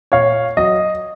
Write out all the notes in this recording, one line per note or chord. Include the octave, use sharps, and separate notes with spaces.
A#2 C#5 F5
F#3 D#5